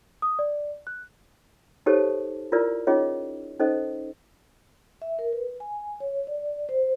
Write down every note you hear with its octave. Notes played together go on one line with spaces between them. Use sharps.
D#6
D5
F#6
D#4 G4 A4 C5 C#5 A5
E4 F4 A#4 B4 D5
C#4 D#4 F4 G#4 C#5 D#5
C#4 D#4 A4 C5 D#5
E5
A#4
B4
G#5
C#5
D5
C5